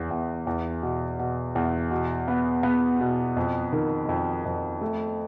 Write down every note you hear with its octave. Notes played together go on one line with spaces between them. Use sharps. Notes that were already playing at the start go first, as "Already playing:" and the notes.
Already playing: E2
E2
E2
B2
B2
E2
B2
B3
B3
B2
F2
D#3
F2
F2
A3